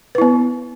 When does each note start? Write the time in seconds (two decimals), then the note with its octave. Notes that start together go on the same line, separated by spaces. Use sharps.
0.15 B4
0.18 E4
0.22 B3